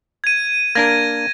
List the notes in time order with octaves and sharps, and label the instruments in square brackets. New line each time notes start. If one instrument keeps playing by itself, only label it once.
[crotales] G#6 D#7
[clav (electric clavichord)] A#3 D4 A#4 [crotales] G#6 A#6